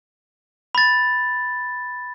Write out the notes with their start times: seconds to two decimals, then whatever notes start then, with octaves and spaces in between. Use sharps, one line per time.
0.75 B5 A6